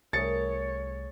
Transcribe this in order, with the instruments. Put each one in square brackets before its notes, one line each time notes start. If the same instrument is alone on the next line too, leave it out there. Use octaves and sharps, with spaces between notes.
[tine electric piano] C2 [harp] A3 G#4 A#4 [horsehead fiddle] C#5 [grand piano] A6 C#7